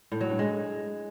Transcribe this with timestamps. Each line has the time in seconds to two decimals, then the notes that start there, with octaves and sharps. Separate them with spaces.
0.12 A2
0.21 F#3
0.30 G2
0.39 G#3